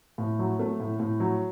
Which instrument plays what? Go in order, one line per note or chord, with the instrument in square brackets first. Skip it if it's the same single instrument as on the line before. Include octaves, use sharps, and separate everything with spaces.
[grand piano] A2
F#3
A3
A2
A2
F#3